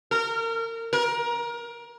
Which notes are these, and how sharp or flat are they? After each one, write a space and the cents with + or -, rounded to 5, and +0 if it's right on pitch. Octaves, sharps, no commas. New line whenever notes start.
A#4 -30
A#4 +25